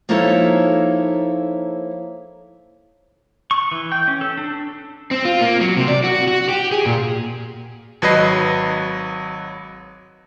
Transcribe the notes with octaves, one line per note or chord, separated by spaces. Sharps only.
F3 A#3 D#4 E4 A4 C#5
C#6
E3
G5
C#4
A4
D4
C4
F4
A#3
F#3
C3
D5
F#4
F#4
G4
G#4
A#2
G#1 F#3 B4 D#5 C7